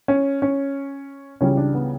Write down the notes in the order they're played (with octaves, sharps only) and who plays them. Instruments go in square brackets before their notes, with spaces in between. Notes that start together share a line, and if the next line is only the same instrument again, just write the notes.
[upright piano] C#4
C#4
C#2 C#3 E3 G3 C#4
D4
B3